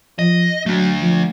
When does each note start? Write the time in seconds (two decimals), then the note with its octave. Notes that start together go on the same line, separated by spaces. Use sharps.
0.19 F3 D#5
0.66 F#3 A3 D4
1.02 F3